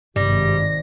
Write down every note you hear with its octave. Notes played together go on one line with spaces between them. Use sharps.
G#1 G2 C3 G3 A#6